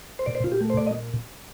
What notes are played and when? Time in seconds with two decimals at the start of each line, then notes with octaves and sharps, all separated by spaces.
0.19 C5
0.26 A#2 D5
0.35 C5
0.44 A#2 F4
0.52 G4
0.61 A3
0.70 C5
0.77 A#2 D5
0.87 D#5